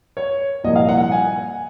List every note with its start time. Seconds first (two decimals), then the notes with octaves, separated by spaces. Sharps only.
0.17 C#5
0.64 C2 A#2 F3 A#3 D#5
0.76 F5
0.89 F#5
1.00 F#5
1.11 G#5